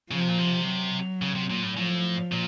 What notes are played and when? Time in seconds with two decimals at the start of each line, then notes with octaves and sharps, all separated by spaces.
0.11 C#3 F3
0.20 C3
0.29 A#2
0.38 C3
0.67 F#3
1.22 C#3
1.35 C3
1.50 A#2
1.62 A2
1.77 A2 F3
2.32 A#2